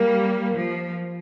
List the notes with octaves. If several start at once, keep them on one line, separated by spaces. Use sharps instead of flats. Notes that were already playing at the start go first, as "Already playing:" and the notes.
Already playing: G3 A#3
F3